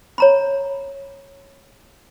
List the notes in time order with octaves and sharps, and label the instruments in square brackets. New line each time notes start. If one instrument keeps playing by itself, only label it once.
[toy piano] C#5 A#5 B5